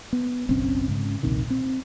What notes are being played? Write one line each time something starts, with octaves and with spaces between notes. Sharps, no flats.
B3
F#1 B1 C4 C#4
G#2 C#3
A#1 D#2 C3 D#3
C4